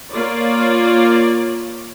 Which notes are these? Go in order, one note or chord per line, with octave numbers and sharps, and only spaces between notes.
A#3 F4 C#5 D5